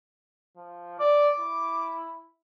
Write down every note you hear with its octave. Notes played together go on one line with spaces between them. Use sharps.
F3
D5 D6
E4